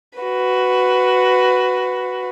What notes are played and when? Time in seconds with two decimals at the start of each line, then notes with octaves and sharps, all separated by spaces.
0.19 F#4 B4